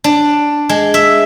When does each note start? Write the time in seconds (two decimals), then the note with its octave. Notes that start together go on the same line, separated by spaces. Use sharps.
0.04 D4
0.69 G#3
0.94 E5